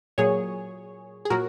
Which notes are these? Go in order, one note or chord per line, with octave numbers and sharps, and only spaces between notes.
A#2 F#3 G#4 C#5
G#4
A#2 F#3 F#4 A#4